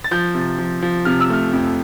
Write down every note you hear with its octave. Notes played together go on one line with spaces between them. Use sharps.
A6
F3 G6
C3
F3
F3
C3 F6
E6
A3 F6
F2